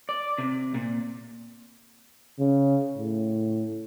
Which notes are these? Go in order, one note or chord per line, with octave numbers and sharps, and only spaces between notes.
D5
C3
A#2
C#3
A2